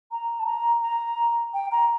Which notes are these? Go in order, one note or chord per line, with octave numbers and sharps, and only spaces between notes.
A#5
A5
A#5
A#5
G5
A#5